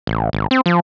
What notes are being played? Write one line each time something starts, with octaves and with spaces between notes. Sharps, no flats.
A1
G#1
C4
F3